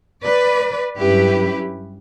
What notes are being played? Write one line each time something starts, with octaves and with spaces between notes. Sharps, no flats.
B4 D5
G2 F#3 C#4 E4 G4 B4